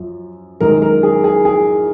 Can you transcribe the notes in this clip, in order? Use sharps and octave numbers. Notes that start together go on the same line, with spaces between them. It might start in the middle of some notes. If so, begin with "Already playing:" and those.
Already playing: F#2 F3
F#2 D#3 G#3 A#4
A#4
G#4
G#4
G#4